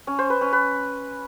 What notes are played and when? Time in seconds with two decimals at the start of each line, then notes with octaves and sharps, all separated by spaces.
0.07 C#4
0.19 C5
0.30 B4
0.41 C#4
0.53 B4